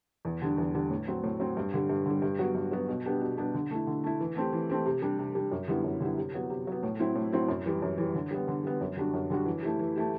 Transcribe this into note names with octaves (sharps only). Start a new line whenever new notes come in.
E2
D3 G3 D4
E2
D3 G3 D4
A2
F#3 C4
A2
F#3 C4
G2
D3 G3
G2
D3 G3
G2
F#3 B3 F#4
G2
F#3 B3 F#4
B2
G3 B3 D4 G4
B2
G3 B3 D4 G4
D3
A3 E4
D3
A3 E4
E3
A3 C4 G4
E3
A3 C4 G4
C3
G3 D4
C3
G3 D4
F#2
D3 G3 B3 E4
F#2
D3 G3 B3 E4
C3
F#3 B3
C3
F#3 B3
A2
F#3 C4 E4
A2
F#3 C4 E4
F#2
E3 G3
F#2
E3 G3
D3
G3 B3
D3
G3 B3
F#2
D3 G3 D4 F#4
F#2
D3 G3 D4 F#4
E3
A3 E4 G4
E3
A3 E4 G4